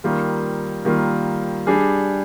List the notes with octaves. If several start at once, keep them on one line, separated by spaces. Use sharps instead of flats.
D#3 G3 A#3 F4
D#3 G3 A#3 F4
G3 D4 G#4